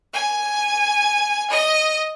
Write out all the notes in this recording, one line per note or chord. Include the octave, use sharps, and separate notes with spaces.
G#5
D#5